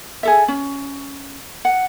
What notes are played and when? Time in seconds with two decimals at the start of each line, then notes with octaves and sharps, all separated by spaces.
0.23 G#4 A4 E5
0.48 C#4
1.65 F#5